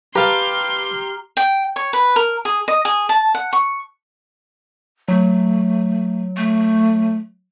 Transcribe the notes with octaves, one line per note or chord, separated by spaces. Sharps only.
G4 B4 F5 A5 A#5 C6 F6
G5
C#5
B4
A#4
G#4
D#5
G#4
A5
F#5
C#6
F#3 A3
A3